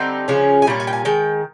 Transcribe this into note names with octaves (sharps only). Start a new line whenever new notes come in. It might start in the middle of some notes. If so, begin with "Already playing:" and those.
Already playing: D3 G3 C4 D#4 F#5
C#3 F3 G#3 C#4
G#5
A#2 G3 C#4
G#5
G5
G#5
D#3 G#3 G5